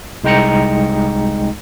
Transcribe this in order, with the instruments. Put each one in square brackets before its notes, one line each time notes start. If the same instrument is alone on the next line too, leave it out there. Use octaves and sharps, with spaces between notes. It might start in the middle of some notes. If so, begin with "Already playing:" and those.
[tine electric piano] C2 G#3 D#4 G5 A#5 C#7